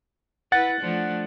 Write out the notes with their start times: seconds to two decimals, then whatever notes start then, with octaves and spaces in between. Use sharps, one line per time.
0.52 E4 B4 F#5 A6
0.81 F3 A3 D4